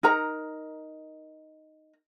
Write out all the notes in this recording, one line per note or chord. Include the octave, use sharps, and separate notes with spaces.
D#4 A#4 A#5